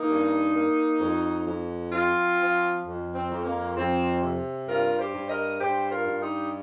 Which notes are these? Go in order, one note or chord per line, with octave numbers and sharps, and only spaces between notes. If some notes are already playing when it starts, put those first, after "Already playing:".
Already playing: A#3 D#4
G2
A#3
F2
F2
F3 C4 F4
F3
F2
C4
F2
A#3
F2 C4
C3
G2 F4 A#4
G4 C5
G2
A#4 D#5
G2 G4 C5
F4 A#4
G2
D#4 G4